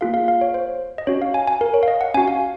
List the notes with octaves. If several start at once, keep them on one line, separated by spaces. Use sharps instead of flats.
A#3 F4 G#4 F5
F5
F5
C#5
C5
D#5
C#4 F#4 C#5
F5
G#5
G#5
A#4
C#5
F5
D#5
F#5
C#4 F#4 G#5
F5